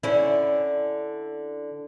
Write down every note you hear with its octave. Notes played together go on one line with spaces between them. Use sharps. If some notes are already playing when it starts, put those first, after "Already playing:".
D3 C#4 E4